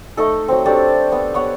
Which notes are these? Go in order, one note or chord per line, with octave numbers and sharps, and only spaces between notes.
A3 D#4 A4
F#3 C4
D4 G4 A4 D5
B3
B3 C#5 F#5